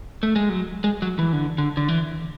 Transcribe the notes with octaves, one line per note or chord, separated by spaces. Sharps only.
A3
G#3
F#3
G#3
F#3
E3
D3
D3
D3
E3